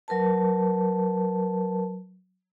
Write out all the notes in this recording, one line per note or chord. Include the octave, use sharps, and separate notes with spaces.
F#3 A#4 B4 A5